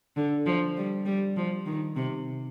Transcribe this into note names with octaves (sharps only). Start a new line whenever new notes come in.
D3
F3
G3
G3
F3
D#3
C3